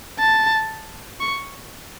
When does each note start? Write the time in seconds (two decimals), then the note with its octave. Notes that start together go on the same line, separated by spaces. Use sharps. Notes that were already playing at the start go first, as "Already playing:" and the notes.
0.19 A5
1.20 C#6